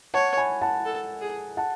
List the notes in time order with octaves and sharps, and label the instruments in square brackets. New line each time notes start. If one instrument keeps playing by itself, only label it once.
[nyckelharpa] C#5 [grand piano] F#5 A5
[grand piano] G#5 B5
F#5 A5
[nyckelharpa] A4
G#4
[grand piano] F#5 A5